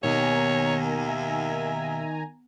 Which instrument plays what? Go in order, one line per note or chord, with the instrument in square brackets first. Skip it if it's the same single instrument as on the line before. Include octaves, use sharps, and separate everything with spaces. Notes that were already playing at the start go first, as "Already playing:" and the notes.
[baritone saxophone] D#2 [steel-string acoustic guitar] B2 [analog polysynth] D#3 G#5 A#5 [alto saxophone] C#5
[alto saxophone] E5